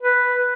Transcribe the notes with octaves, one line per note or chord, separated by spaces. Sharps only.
B4